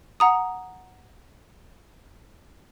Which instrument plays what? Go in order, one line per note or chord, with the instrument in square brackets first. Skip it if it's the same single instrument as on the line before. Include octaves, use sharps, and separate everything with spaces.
[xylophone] F#5 A#5 D#6